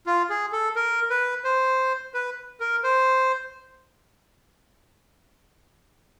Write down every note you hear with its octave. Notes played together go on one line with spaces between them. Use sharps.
F4
G#4
A4
A#4
B4
C5
B4
A#4
C5